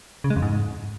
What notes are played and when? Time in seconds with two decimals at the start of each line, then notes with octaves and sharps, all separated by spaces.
0.24 C#3
0.30 G#3
0.36 F2
0.42 G#2